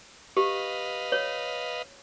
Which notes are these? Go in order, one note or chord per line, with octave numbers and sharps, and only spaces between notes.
G4 B4 D#5 F5
C#5